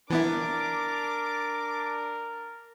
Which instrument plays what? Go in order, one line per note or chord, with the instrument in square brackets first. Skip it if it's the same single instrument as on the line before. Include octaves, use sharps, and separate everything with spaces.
[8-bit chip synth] E3 B3 E4 [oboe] D4 [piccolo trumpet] A#4 [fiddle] D6